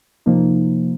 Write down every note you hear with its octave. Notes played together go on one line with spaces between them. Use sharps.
C3 F3 A#3 D#4